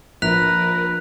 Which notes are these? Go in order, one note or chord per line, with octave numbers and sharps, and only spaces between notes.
A#1 A#4 B4 F#6 B6 F7